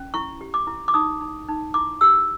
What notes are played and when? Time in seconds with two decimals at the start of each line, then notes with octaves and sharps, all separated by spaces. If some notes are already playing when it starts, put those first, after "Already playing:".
Already playing: C#4
0.14 E4 C#6
0.41 G4
0.54 D6
0.67 E4
0.88 D6
0.94 D#4 D#6
1.21 D#4
1.48 D#4
1.74 E4 D6
2.01 G4 E6